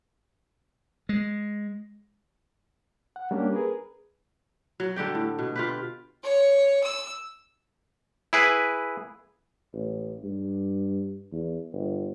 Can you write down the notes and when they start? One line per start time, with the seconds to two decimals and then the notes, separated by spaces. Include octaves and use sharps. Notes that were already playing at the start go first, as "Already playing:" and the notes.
1.09 G#3
3.16 F#5
3.31 G3 A#3 C#4 D4 G4
3.52 G#4 A#4 B4
4.80 F#3
4.96 D3 G3 G4 G5
5.15 A2
5.39 B2
5.56 F4 G4 B4
6.23 C#5
6.84 E6
8.33 E4 G#4 B4
9.74 A1
10.24 G2
11.32 E2
11.73 G1